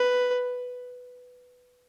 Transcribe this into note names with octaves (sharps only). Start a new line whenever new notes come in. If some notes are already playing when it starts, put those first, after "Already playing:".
Already playing: B4